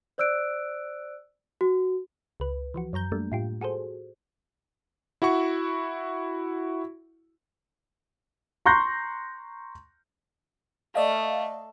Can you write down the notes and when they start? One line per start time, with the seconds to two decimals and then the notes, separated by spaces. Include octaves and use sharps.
0.18 C5 D5 E6 F#6 D7
1.61 F#4
2.40 C#2 B4
2.74 E3 F3 F#4
2.93 F#2 F#3 A#5 G6
3.12 G3 A3 A#3 D4
3.32 A2 F4 G4
3.61 F#4 G#4 A4 C5
5.22 E4 F#4 F#5 C#6
8.66 A#5 C6 C#6 F#6 G6 A#6
10.95 A3 D5 D#5 F5